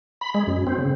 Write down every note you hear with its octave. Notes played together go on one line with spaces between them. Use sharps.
B5
G#3
F#2
C4
C#3